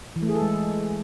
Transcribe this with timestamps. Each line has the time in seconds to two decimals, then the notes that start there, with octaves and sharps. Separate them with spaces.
0.16 E3
0.22 A3
0.29 G#4
0.35 A4
0.42 G#3